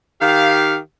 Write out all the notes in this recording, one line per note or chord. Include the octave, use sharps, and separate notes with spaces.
D#3 G4 F5